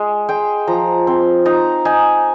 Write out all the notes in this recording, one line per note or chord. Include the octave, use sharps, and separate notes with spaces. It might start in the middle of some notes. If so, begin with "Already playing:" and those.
Already playing: G#3
G#3 G5
F3 A#5
C4
D#4 A#5
D#4 G#5